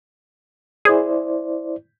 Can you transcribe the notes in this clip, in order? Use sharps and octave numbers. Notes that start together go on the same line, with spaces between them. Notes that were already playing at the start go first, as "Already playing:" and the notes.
E4 G#4 C5 D5